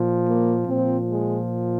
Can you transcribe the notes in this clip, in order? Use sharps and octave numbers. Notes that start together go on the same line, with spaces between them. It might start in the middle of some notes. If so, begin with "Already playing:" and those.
Already playing: A#2 F3
A#3
A#2 F3 C4
G#3